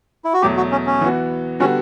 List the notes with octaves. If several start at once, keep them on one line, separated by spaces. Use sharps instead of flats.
E4
F#4
E2 B2 F#3 A3 G4
F#4
C#4
C#4
E3 B3 F#4
D3 G3 B3 C#4 F#4